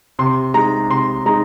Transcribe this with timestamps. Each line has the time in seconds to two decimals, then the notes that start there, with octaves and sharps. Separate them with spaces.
0.19 C3 C6
0.54 G#3 D#4 A#5
0.90 C3 C6
1.26 G#3 D#4 A#5